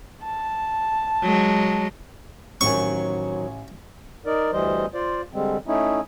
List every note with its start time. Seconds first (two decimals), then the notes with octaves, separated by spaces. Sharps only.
0.23 A5
1.23 F#3 G#3
2.61 A1 D#3 F#3 C4 G#5 C#6
4.26 D#4 A#4 D5
4.52 D2 E3 G3 C5 D#5
4.94 F4 C5 D5
5.33 D3 G3 G#3 C4
5.67 A3 C#4 D#4 E4